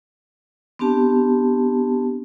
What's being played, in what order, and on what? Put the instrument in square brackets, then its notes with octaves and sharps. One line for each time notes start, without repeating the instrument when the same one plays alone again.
[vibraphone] B3 C4 D4 G4 A5